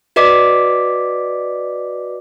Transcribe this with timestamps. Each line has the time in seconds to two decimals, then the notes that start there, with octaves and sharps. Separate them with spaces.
0.16 F#4 B4 D5 D#5 D6 B6